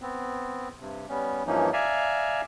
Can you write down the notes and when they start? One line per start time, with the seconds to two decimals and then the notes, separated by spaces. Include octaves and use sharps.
0.02 B3 C4
0.80 G2 C3
1.09 G3 B3 C#4
1.47 G2 E3 F3 A#3 C#4 D#4
1.73 D5 E5 F5 G#5 A#5